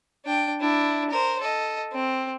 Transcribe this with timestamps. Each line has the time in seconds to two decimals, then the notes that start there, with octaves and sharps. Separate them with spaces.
0.25 D4 G5
0.61 D4 E4
1.09 A#4 C5
1.41 A4 D#5
1.92 C4